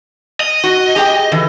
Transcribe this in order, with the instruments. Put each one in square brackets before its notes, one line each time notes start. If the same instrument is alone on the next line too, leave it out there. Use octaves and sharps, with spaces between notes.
[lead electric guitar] D#5
[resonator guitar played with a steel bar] F#4
G4 G#4 G5
D3 E3